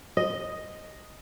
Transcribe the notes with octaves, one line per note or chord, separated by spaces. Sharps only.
D#5